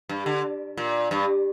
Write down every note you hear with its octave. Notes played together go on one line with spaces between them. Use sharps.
G2
D3
A#2
G2